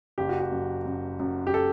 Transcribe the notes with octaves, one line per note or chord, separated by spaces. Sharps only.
F#1 G4
F#4
G4
F#2
F#2
F#2
G4
A4